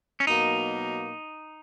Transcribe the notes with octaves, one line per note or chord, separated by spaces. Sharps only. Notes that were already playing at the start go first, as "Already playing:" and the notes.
C#4
B2 F#3 A#3 D#4